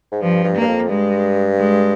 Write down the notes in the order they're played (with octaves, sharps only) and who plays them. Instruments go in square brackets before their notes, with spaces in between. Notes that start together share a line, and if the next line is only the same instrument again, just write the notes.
[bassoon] G#2
[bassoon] G2 [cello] F3
[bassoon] G2
[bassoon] G2 [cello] A#3
[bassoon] F2
[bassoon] G2 [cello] G#3
[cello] G#3